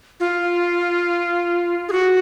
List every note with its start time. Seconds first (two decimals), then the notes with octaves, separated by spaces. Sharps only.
0.20 F4
1.89 G#4
1.92 F#4